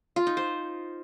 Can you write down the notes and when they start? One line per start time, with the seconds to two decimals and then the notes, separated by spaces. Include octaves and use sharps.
0.16 F4
0.27 D#4
0.37 C5